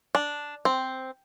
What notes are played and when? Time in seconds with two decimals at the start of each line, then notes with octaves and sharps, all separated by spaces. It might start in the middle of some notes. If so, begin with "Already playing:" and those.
0.15 D4
0.65 C4